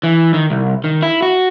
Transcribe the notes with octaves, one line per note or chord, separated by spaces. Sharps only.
E3
D#3
C2
D#3
E4
F#4